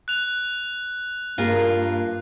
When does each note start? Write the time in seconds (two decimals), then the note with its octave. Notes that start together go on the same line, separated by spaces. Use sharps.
0.08 F#6 F7
1.38 G2 A#3 F4 G#4 A#4